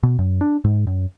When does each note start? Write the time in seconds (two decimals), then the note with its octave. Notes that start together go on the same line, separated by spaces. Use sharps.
0.03 B2
0.19 F#2
0.41 D4
0.64 G#2
0.87 F#2